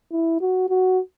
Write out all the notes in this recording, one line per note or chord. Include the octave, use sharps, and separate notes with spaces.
E4
F#4
F#4